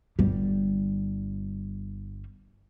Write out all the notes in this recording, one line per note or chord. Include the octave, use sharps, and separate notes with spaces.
G1 G3